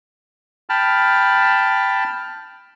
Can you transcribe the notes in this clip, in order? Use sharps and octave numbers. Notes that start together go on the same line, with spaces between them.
G5 A5 B5 F6